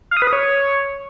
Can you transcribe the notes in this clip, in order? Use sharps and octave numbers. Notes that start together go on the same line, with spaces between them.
F5
D#6
B4
D#6
C#5